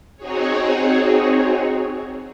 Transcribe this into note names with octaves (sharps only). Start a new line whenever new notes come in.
C4 D#4 F#4 G#4 C#5